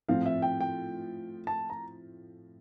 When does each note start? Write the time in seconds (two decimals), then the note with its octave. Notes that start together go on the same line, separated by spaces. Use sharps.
0.09 A2 F3 C4 F4 F5
0.26 E5
0.42 G5
0.60 G5
1.47 A5
1.70 A#5